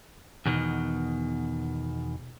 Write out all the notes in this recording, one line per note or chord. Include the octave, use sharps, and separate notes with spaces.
E2 B2 D3 D#3